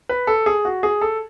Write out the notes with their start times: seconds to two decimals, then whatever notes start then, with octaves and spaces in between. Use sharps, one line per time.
0.09 B4
0.27 A4
0.46 G#4
0.65 F#4
0.83 G#4
1.01 A4